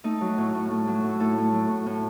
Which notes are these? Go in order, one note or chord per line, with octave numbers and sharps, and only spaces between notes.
A3 D#4
F#3
A2
A2
A3
F#3
A2 E4
A2 A4
A3
F#3
A2
A2